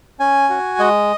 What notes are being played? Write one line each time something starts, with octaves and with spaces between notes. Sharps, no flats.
C#4 G#5
F#4
G#3 D#5